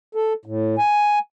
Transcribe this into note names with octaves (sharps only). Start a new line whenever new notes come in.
A4
A2
G#5